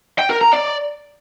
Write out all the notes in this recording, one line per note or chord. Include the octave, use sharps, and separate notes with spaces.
G5
A#4
A#5
D5